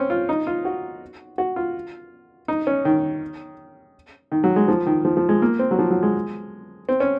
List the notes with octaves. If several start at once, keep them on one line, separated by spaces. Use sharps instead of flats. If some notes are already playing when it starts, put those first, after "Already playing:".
Already playing: C4 C#4
F4
D#4
F4
F#4
F#4
F4
D#4
C#4
D#3
D#3
F#3
G#3
F3
D#3
F3
F3
G#3
A#3
C4
F#3
F3
F#3
G#3
C4
C#4